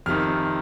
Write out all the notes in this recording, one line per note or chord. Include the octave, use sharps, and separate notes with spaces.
F2 C3 D#3 F6